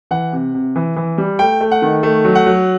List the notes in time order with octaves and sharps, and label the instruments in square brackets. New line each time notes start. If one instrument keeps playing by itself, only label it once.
[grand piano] E3 F#5
C3
C3
E3
E3
G3
A3 G5
A3
F#5
D#3
A3
F#3
F#5
F#3